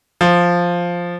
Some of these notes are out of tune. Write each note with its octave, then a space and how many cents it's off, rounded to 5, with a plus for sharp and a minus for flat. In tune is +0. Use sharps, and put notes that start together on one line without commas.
F3 +0